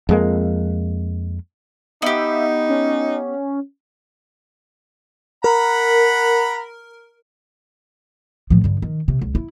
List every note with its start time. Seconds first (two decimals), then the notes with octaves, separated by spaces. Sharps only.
0.09 F2 G#3 A#3
2.02 B3 D#4 G4 E5
2.69 C#4
5.44 A#4 F#5 A#5 B5
8.50 A2 F3
8.64 G2 D3
8.82 D#3
9.08 C3
9.22 C#2
9.35 E4